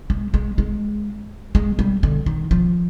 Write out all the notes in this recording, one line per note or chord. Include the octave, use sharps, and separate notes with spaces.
G#3
G#3
G#3
G#3
G3
D3
D#3
F3